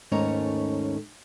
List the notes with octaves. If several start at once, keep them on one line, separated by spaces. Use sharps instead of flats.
D#2 G#2 A3 C#4 C#5 A#5